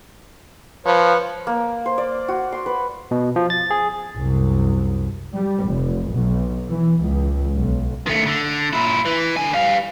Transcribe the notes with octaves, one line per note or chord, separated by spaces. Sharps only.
F3 B4 C#5
A#3
C5
D5
F#4
C6
B4
B2
F3
A6
G#4
C2 F#2
G3
F1
B1
E3
C#2
B1
D#3 A3
D3
A#2 E4
E3
D3 G#5
G3 F5